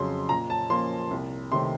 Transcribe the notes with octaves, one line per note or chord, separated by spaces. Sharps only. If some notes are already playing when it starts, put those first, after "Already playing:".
Already playing: F2 C#3 F#3 C6
A#2 A#5
A5
F3 A#3 C#4 C6
C2
C3 D#3 A3 C4 C6